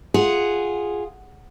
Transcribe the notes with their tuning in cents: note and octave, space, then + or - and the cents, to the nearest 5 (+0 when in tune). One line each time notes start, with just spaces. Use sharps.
F4 +0 G#4 +0 F#5 +0